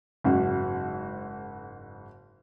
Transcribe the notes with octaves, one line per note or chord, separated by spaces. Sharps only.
F#1 G#2 F#4